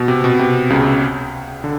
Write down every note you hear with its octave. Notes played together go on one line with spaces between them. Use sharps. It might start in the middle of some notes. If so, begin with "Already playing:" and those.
Already playing: B2
C3
B2
C3
C#2 C#3
D3